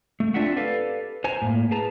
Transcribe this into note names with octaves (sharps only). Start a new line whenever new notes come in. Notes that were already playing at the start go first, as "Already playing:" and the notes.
A3
C4 D4 F4 E5 F#5
G4 A4 B4 D5 F5
C5 G#5 A#5
A2 A#3
G#4 B4 A5 A#5